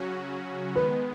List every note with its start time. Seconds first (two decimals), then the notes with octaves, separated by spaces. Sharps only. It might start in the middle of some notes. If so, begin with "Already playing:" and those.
Already playing: C#3 F#3 C#4 F#4
0.75 D#3 G#3 B3 B4